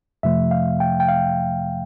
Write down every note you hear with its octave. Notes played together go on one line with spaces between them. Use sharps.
F2 C3 F3 A3 E5
F5
G5
G5
F5